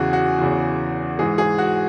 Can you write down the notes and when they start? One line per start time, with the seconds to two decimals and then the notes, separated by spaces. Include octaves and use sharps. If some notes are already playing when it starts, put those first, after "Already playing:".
Already playing: E2 C#3 E3 F#4 G#4
0.13 F#4
0.38 E2 C#3 E3
1.19 G#2 E3 G#4
1.38 G#4
1.58 F#4